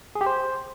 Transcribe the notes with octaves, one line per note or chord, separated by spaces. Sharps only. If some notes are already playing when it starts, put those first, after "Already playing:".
G#4
G4
C5